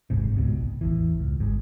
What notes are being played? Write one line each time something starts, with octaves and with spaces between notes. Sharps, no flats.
D1 G1 G#2 C3
C#2 G#2 B2
A#1
A1 E2 E3
C#2
G#1 G#2